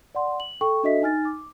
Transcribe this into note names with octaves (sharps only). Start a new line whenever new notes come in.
D5 F#5 C6
F#7
A4 G5 C#6
D4 F#4 A4 D#5 E5 B6
D#4 G#5 F6 A6
D6